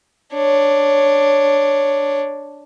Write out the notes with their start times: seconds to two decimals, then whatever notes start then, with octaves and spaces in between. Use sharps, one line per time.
0.34 D4 C#5